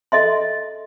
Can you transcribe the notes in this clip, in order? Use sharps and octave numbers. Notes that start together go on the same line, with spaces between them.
A4 D#5 E5 C6